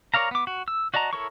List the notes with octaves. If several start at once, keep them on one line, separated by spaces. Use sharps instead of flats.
A#4 C#5 D5 F5 A#5
B3 D6
F#4
E6
F#4 D5 D#5 A5 A#5
E4 A4 A#4 C#5 C#6